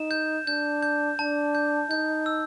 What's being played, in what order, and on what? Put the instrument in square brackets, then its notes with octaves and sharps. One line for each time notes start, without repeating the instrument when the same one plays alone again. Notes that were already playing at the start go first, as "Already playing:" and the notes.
Already playing: [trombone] D#4 [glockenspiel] E7
[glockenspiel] G6
[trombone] D4 [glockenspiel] G6
[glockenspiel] G6
[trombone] D4 [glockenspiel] A5
[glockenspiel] G6
[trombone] D#4 [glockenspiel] G6
[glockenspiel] E6